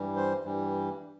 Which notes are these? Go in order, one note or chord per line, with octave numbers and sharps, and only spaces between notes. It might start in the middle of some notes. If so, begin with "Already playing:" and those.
Already playing: G2 E3 G3
C5
G2 E3 G3